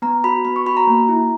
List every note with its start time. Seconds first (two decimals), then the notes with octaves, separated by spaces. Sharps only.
0.02 B3 A#5
0.24 F#4 B5
0.45 B3 B5
0.56 C#6
0.66 F#4 B5
0.77 A#5
0.87 A#3
1.09 E4